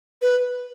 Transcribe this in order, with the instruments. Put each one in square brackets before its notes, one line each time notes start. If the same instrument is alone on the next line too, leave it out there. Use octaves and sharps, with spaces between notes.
[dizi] B4